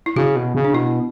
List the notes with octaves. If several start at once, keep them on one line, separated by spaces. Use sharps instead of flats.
E4
C#3 F#4
B2
C#3
D4
B2 E4